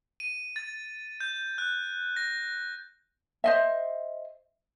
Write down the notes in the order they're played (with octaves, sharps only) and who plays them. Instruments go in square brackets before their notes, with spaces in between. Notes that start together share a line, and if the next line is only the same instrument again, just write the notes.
[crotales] D#7
A6
G6
F#6
A#6
[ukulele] C5 D#5 E5